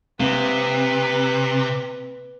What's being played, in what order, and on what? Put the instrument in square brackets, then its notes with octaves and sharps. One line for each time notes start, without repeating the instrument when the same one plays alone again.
[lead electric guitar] C3 [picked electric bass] A#3 C4 [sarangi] B4